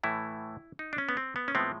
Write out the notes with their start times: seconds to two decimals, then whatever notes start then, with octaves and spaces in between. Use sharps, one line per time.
0.03 A2 E3 A3 E4
0.79 D#4
0.93 D4
0.98 C#4
1.09 B3
1.17 C4
1.36 B3
1.48 C#4
1.55 A2 F3 G#3 B3 C4